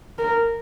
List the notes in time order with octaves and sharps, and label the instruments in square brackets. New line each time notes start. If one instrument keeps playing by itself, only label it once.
[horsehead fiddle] A#4